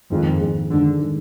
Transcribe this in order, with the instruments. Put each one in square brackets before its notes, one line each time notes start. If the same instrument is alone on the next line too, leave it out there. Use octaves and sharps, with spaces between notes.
[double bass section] F2 [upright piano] G#2 D#3 G#3
[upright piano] G#2 D#3 G#3
[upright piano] G#2 D#3 G#3 [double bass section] D3
[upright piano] D#3 G#3